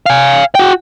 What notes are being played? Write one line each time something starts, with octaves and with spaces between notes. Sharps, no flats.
F5 G#5
F#4 G5